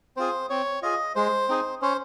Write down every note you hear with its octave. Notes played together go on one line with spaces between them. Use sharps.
C4 F4 G#4 C5
C4 C#5
F4 G#4 D#5
G#3 C5
C4 D#4 G#4
C#4 C5